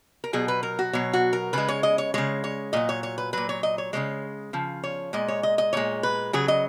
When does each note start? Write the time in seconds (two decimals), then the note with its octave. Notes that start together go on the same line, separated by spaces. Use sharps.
0.24 A#4
0.33 B2 F#3 G#4
0.48 B4
0.63 A#4
0.79 F#4
0.93 B2 F#3 C#5
1.13 F#4
1.33 A#4
1.53 C#3 G#3 B4
1.68 C#5
1.83 D#5
1.98 C#5
2.14 C#3 G#3 C#5
2.44 C#5
2.73 A#2 F#3 D#5
2.89 C#5
3.03 C#5
3.18 B4
3.33 A#2 F#3 B4
3.49 C#5
3.63 D#5
3.78 C#5
3.93 C#3 F3 G#3 C#5
4.53 C#3 F3
4.84 C#5
5.13 A#2 G#3 D#5
5.28 C#5
5.43 D#5
5.58 D#5
5.73 A#2 G#3 C#5
6.03 B4
6.33 C#3 F#3 G#4
6.48 D#5